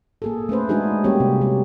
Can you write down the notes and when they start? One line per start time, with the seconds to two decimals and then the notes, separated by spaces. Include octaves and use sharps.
0.22 A#3 G#4 A4
0.49 A3 C#4 B4 C5
0.69 G#3 D4 D#4 F#4 G#4
1.04 G3 A#3 C#4 F#4 G4 C#5
1.20 C3
1.41 G3